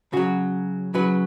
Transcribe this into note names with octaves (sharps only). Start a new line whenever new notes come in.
C#3 F#3 F#4
C#3 F#3 B4